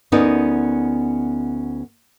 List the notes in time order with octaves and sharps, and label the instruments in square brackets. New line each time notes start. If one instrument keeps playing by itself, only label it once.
[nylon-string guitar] D2 B3 C#4 D#4 A#4 D5